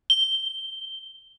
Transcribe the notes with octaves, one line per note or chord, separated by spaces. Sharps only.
G7